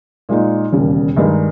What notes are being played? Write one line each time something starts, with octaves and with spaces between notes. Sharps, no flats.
A#2 G#3 D#4
E1 D#2 C#3 G3
G2 D#3 G#3 D#4